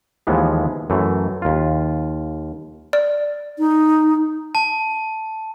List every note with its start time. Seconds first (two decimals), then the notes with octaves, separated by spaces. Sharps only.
0.27 D#2 E3 F3 G#3 B3
0.90 F#2 E3 A3
1.42 D#2 F4
2.93 D5
3.59 D#4
4.55 A5